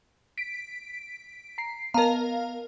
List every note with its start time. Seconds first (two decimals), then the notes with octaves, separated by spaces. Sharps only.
0.38 B6 D7
1.58 A#5 C7
1.94 B3 A#4 D#5 F5 A5 A#5